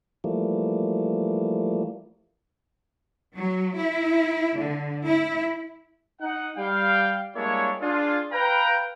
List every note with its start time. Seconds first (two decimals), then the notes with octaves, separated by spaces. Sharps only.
0.24 E3 F3 G3 A3 A#3
3.36 F#3
3.76 E4
4.57 D3
5.06 E4
6.21 D#4 F#5
6.57 G3 F5 G5
7.35 G3 G#3 A#3 D4 E4 C#5
7.82 D4 F4 G#4
8.32 B4 F5 G5 A#5